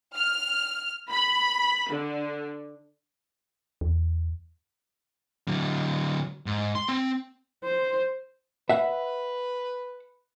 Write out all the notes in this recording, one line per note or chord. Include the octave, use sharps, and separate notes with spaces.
F6
B5
D3
E2
D3 F#3
G#2
C6
C4
C5
B4 E5 F#5